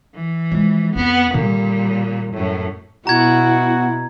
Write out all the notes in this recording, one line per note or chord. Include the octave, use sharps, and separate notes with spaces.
E3
F3 G#3
F2 B3 E4
A#2 D3 D#3 G3
F#2 A2
B2 E4 F#4 A#5 G#6